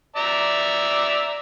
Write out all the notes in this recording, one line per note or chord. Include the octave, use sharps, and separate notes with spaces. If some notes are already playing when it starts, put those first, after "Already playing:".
D5 E5 A#5